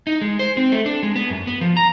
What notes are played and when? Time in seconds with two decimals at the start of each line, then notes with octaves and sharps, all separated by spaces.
0.07 D#4
0.21 G#3
0.39 C5
0.57 C4
0.72 A3
0.86 D4
1.03 G#3
1.16 B3
1.30 F#2
1.47 B3
1.61 F3
1.77 A#5